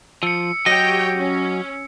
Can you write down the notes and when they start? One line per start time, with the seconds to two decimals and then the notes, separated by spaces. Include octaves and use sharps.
0.23 F3 E6 C#7
0.66 F#3 G4 C#5 D#5 G5 A#6
1.17 C#4